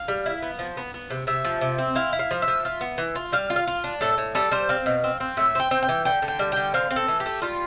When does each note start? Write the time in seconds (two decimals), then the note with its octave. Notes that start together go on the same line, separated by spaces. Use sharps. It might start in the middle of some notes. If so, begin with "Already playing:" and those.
Already playing: F5
0.08 G3
0.26 E4
0.42 B3
0.59 F3
0.77 B3
0.94 B3
1.10 C3
1.27 C3 E5
1.45 F3
1.61 C3
1.78 C4
1.95 E4 F5
2.13 E4
2.19 F5
2.31 F3
2.42 E5
2.48 F3
2.65 F4
2.81 B3
2.98 E3
3.15 F4
3.32 G3 F5
3.50 F4
3.56 F5
3.67 F4
3.84 D4
4.01 A2 A4
4.18 A2
4.35 G3 A4
4.51 G3 C5
4.69 C4 F5
4.86 B2
5.04 C4
5.20 C4
5.37 A2 E5
5.55 C4 G5
5.71 C4
5.83 G5
5.89 E3
6.05 D3 G5
6.22 D3
6.28 G5
6.39 G3
6.52 D3 G5
6.74 C4 F5
6.91 C4
6.96 A4
7.08 E3
7.20 G4
7.26 A3
7.42 G3 F4